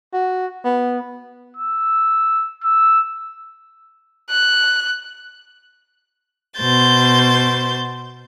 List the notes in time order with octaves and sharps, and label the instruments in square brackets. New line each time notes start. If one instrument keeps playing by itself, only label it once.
[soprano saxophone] F#4
B3
[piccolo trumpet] E6
E6
[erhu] F#6
[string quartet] B2 C5 G6 A6